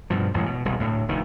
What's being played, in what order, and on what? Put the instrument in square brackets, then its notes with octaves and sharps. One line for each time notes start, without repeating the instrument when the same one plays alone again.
[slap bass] G2 B2 F3
A1 E2 A2 G#3
B2
E1 C2 E3
D2 A2
F1 D2 D#3